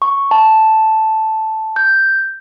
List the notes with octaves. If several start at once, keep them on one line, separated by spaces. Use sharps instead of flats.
C#6
A5
G6